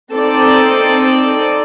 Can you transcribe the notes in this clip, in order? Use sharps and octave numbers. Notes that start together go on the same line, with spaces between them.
C4 D#4 A4 D5